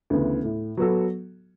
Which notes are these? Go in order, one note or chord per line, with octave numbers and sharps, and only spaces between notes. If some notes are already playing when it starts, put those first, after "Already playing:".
D2 C#3 E3 B3
A2
F#3 B3 F#4 A4